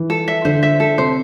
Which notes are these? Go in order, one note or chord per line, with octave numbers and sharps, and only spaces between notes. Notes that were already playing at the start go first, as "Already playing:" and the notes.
Already playing: E3
A4
E5
D3 C5
E5
A4
C3 C5